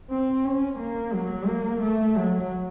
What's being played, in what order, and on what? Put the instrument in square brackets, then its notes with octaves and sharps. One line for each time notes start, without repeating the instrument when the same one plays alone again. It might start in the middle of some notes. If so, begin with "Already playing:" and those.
[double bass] C4
C#4
A#3
F#3
A#3
A3
F#3